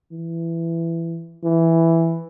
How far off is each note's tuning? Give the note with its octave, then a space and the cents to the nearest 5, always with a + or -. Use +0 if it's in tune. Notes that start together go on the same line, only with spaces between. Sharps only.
E3 +15
E3 +0